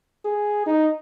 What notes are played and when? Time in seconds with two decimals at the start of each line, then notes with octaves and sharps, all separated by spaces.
0.25 G#4
0.66 D#4